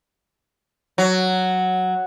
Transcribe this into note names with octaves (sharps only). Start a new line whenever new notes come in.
F#3